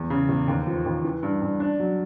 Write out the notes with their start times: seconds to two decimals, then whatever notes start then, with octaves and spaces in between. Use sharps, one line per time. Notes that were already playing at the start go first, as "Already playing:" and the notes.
Already playing: E2
0.10 C#3
0.29 E2
0.48 D#2
0.67 F3
0.86 D#2
1.05 E3
1.23 G2
1.42 G2
1.60 D4
1.79 F#3